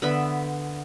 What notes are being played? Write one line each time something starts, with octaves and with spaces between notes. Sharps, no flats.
D3 B3 E5 B5